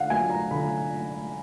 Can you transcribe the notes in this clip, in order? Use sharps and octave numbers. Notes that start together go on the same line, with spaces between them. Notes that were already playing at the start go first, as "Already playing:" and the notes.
Already playing: D3 F5 F#5
F#3 A#3 G#5
A#5
D3 B5